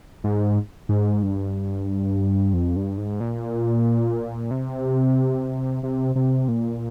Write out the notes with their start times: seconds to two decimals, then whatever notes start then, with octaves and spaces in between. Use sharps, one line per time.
0.24 G#2
0.89 G#2
1.23 G2
2.54 F2
2.76 G2
2.98 G#2
3.20 A#2
4.51 C3
5.83 C3
6.16 C3
6.48 A#2